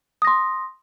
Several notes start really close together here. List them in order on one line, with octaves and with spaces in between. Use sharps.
D#6 A#6 C6